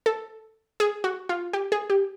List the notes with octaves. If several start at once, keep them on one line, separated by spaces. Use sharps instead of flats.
A4
G#4
F#4
F4
G4
G#4
G4